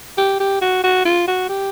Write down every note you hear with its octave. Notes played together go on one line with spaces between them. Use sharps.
G4
G4
F#4
F#4
F4
F#4
G4